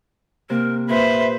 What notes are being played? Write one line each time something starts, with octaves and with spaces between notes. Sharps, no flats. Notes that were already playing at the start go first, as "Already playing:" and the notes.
C3 A#3 A#4
A#2 B4 C5 E5